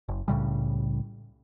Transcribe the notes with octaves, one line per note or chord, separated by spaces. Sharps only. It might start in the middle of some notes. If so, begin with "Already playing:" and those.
F#1
C2 A2 C#3 G3